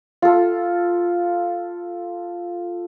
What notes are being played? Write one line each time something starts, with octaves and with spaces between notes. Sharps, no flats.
F4 A4